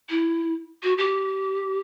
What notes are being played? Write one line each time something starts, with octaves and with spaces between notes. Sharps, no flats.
E4
F#4
G4